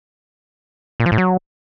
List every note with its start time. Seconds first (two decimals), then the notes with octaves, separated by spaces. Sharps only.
1.00 A#2
1.06 F3
1.12 A2
1.18 F#3